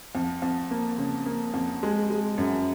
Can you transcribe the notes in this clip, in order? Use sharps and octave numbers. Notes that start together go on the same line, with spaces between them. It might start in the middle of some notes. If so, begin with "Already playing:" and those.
F2
F2
A#3
C#3
A#3
F2
G#3
G#3
F#2